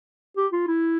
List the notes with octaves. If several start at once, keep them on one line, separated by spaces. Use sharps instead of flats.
G4
F4
E4